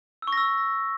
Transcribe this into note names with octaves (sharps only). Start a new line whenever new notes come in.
E6
C#6
A#6
E6